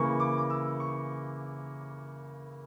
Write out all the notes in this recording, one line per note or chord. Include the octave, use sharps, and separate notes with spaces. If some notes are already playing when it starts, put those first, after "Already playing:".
Already playing: C#3 E3 A#3 C#6
D6
D6
E6
C#6